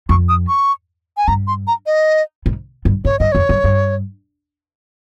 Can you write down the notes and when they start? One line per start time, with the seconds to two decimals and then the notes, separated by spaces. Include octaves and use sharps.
0.09 F2 C#6
0.29 D#6
0.48 C#6
1.17 G#5
1.28 G2 A#5
1.47 C6
1.67 A#5
1.86 D#5
2.46 G#2
2.85 G2
3.05 G#2 C#5
3.19 G2 D#5
3.32 F2 C#5
3.49 G2
3.64 G2